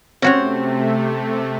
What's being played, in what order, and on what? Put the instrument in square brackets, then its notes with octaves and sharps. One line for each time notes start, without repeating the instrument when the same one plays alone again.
[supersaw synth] C3 A3 [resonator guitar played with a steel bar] C4 [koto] C#4 F#4 C#5